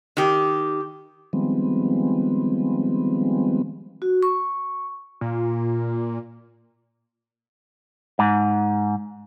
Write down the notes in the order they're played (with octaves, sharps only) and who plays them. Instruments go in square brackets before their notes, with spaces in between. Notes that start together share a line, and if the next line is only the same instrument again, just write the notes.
[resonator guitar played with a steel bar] D#3 G4
[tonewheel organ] D#3 F3 G3 G#3 B3 C4
[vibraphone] F#4
C#6
[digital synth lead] A#2
[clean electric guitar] G#2